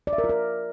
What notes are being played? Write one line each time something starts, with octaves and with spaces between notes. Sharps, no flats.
D5
E5
A#4
F4
A#4